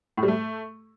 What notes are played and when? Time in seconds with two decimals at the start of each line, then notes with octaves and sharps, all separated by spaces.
0.17 A2
0.23 G3
0.28 A3